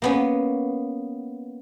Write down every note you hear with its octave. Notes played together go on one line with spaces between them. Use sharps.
A#3 B3 C#4